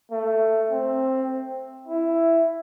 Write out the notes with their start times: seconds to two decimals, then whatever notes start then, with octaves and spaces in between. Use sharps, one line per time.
0.11 A3
0.71 C4
1.88 E4